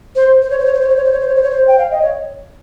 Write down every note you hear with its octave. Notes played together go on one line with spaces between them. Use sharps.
C5
C5
C#5
C5
C#5
C5
C#5
C5
C#5
C5
C#5
C5
C#5
C5
C#5
C5
G5
F5
D#5
C#5